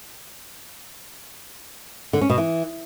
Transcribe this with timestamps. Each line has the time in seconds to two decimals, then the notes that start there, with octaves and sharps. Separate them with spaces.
2.13 D3
2.21 C#4
2.30 B2
2.38 E3